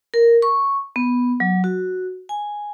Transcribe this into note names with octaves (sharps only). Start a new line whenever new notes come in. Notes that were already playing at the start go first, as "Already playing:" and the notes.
A#4
C#6
B3
F#3
F#4
G#5